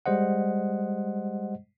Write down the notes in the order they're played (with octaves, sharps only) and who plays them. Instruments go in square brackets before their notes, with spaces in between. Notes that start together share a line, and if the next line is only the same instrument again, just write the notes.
[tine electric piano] G3 G#3 C5 D#5 F#5